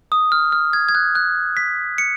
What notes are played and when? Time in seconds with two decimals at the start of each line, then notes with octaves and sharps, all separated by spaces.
0.12 D#6
0.32 F6
0.52 F6
0.73 G#6
0.89 G#6
0.95 F#6
1.15 F#6
1.57 B6
1.98 C#7